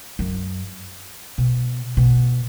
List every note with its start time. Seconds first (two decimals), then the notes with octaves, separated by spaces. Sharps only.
0.19 F#2
1.38 B2
1.97 B2